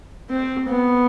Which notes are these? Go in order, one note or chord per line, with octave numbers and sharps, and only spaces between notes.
C4
B3